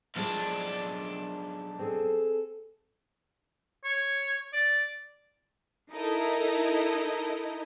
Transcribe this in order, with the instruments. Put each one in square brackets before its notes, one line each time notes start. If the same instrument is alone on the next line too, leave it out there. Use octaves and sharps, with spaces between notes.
[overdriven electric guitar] B1 D4 [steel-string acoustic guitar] F3 G#3
[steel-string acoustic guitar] C4 G#4 A4
[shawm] C#5
D5
[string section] D#4 E4 A4 A#4 D#5